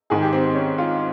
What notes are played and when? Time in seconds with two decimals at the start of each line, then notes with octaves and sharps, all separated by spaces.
0.10 G#2 D#3 G#4
0.22 G4
0.33 C4
0.44 C4
0.55 C#4
0.78 F4